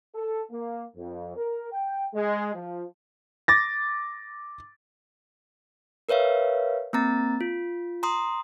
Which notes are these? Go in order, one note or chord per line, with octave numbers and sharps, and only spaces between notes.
A4
A#3
F2
A#4
G5
G#3
F3
D6 A6 A#6
A#4 B4 C#5 E5 F5
A#3 C4 A#5 A6
F4
A#5 C6 D#6